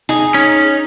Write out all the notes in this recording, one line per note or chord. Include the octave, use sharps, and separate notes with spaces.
D#4 G#4
C#4